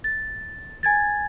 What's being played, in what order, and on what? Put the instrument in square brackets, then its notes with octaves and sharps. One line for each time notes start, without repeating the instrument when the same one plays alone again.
[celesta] A6
G#5 G#6 A6